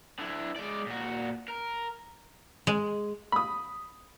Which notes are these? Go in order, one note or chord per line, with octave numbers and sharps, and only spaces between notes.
D3 E4
G#3 D5
A#2 F#4
A#4
G#3
B5 D#6